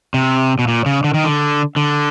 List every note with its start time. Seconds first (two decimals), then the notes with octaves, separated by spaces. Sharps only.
0.14 C3
0.59 B2
0.68 A#2
0.86 C#3
1.04 D3
1.14 D#3
1.24 D3
1.76 D3